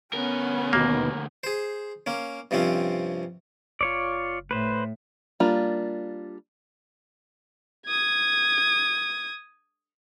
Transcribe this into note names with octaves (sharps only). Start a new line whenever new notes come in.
D2 B3 C#4 A#4
D#2 B2 A#3
G#4 C5
A#3 C#4
G2 C3 F3 C4 C#4
F#1 F4 C#5 D5
A2 B4 C5
G3 A#3 D4 F4
D#6 G#6